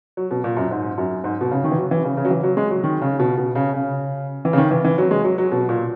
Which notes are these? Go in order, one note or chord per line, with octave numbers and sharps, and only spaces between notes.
F#3
B2
A#2
F#2
G#2
F#2
G#2
B2
C#3
D#3
E3
F#3
E3
C#3
C#3
F#3
E3
F#3
G#3
F#3
D#3
C#3
B2
B2
C#3
C#3
E3
C#3
D#3
E3
E3
F#3
G#3
F#3
F#3
B2
A#2